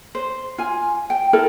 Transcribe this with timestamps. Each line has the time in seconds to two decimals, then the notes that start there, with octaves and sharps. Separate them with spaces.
0.15 C5
0.58 F4 G#5
1.10 G5
1.33 E4 A4 A#4